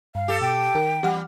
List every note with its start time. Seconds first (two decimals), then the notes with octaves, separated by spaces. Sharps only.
0.15 G2 F5
0.28 G4 A4
0.41 B2 G5
0.75 D#3 A#4
1.03 E2 G3 G4 F#5 F6